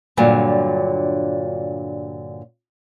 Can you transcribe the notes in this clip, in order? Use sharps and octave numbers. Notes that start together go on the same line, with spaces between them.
G2 A#2 D3 F#3